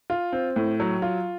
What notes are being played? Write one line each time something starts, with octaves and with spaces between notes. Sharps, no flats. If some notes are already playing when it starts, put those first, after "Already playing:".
F4
C4
A2
F#3
F4